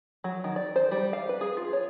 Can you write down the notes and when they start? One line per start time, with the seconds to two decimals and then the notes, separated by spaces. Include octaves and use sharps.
0.24 F#3
0.44 D#3
0.56 D5
0.76 C5
0.91 G3
1.13 F5
1.29 B4
1.41 G#4
1.57 F4
1.73 C#5